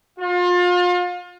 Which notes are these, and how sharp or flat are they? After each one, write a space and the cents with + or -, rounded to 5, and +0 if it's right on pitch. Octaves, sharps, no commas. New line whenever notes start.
F4 +35